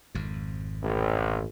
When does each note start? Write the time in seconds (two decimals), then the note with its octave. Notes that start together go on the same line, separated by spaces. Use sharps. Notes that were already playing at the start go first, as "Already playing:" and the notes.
0.15 G#1 F2
0.82 A1